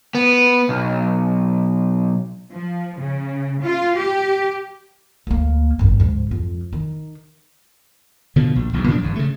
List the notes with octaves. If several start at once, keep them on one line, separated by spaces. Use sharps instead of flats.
B3
B1
F3
C#3
F4
G4
D2 A#3
G#1 F#2
D2 G#2
F2
D#3
B2 D3 F3
A#1
E1 B1 E2
A#2 F3 F#3 D4
G#1 G2
C#3 A3